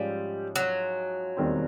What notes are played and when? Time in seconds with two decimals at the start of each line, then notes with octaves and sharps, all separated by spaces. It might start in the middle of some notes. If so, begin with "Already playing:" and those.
Already playing: G#2 F3 G3 G#3 C#4
0.56 F#3
1.37 E1 D#2 D#3 G3 C4